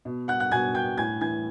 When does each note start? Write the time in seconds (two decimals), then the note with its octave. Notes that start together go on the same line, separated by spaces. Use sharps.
0.05 B2
0.28 F#5 F#6
0.40 F#5 F#6
0.51 B2 G#5 G#6
0.74 G5 G6
0.98 A2 G#5 G#6
1.21 E3 G#5 G#6